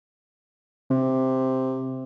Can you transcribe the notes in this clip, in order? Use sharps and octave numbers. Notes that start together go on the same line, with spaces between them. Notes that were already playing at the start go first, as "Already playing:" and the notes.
C3